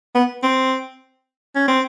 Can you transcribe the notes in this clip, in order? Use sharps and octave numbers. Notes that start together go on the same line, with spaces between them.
B3
C4
C#4
C4